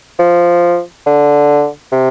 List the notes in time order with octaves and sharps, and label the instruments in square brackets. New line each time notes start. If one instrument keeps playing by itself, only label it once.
[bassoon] F3
D3
C3